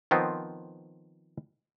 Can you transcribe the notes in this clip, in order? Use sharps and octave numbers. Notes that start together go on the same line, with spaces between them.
D#3 F3 B3 C4